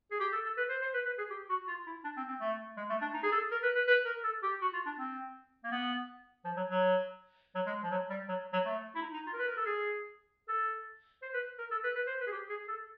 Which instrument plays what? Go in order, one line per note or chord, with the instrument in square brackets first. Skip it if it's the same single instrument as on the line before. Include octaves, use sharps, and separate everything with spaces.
[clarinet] G#4
G4
A4
A4
B4
C5
C5
B4
B4
G#4
G4
F#4
F4
E4
D4
C4
C4
A3
G#3
A3
D4
D#4
G#4
A4
A#4
B4
B4
B4
A#4
A4
G4
F#4
F4
D4
C4
A#3
B3
F3
F#3
F#3
F#3
G#3
F3
F#3
G3
F#3
F#3
A3
E4
D#4
D#4
F4
A#4
B4
A#4
A4
G#4
A4
C5
B4
A#4
A4
B4
B4
C5
B4
G#4
G4
G#4
A4